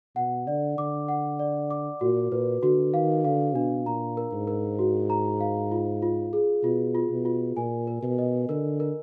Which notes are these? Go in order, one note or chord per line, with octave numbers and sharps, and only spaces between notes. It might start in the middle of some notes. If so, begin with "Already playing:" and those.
B2 F#5
D3 D5
D3 D6
F#5
D5
D6
A#2 F#4
A#2 B4
D3 F#4
D#3 F5
D3 F5
B2 D4
A#2 A#5
A#4
G#2
A#4
F#4
A#5
F5
F4
F4
G#4
B2 F4
F4
B2
F4
A#2 G#5
A#4
B2
D#5
D3 A#4
A#4